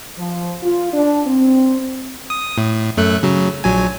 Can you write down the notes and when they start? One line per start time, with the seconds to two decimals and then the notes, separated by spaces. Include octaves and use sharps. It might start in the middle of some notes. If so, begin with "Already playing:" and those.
0.19 F3
0.63 F4
0.93 D4
1.26 C4
2.30 D#6
2.58 A2
2.98 F#2 A3 F#6
3.23 C#3 F#3
3.64 A#1 F#3 G#5